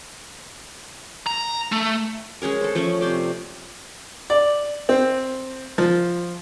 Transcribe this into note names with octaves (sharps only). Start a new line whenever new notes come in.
A#5
A3
G#3 C#4 G#4 A#4
A4 C5
F3 A3 C#4
C3 C5 D5
D5
C4
F3